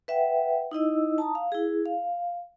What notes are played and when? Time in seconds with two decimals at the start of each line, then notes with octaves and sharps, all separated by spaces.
0.08 B4 E5 F#5 G5
0.71 D#4 E4 D#5 E6
1.18 A5 A#5 D#6
1.35 F5
1.52 E4 G#4
1.86 F5